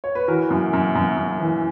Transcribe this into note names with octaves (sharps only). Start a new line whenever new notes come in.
C#5
B4
E3 F#4 A#4
F#2
F#2
F#2
F#2
E3